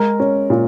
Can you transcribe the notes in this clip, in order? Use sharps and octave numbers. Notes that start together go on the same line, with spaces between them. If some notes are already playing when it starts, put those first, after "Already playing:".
Already playing: G#3 A#4
C#4
A#2